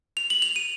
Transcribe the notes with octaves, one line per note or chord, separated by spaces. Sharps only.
F7
F#7
F7
D#7